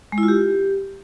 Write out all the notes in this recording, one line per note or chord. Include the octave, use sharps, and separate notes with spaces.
G#3
E4
F4
G4